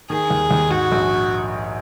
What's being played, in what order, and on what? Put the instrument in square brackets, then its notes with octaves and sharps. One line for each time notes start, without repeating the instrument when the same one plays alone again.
[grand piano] D#3 [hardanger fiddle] G#4
[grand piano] D#2
D#2
[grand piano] G#2 [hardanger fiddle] F#4
[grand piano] A#1